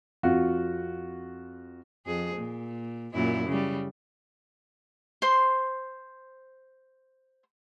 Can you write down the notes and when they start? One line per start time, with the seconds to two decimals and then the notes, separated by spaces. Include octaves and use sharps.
0.23 F2 F4 F#4
2.06 F2 G#4
2.35 A#2
3.14 F#2 A#2 E4
3.48 C#3 G3
5.22 C5 C6